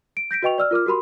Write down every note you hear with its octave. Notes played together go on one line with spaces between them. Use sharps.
D7
G6 A#6 B6 D7
F#4 B4 D#5 G5 C#6 F7
D5 E6 F6
F4 A#4 D6 F6
F#4 G4 A#4 B5 C6